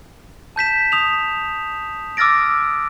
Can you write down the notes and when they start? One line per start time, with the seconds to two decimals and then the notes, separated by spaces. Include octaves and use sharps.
0.56 A5 G6 B6 E7
0.92 D#6 B6 F7
2.17 D6 E6 F6 A6 A#6 D7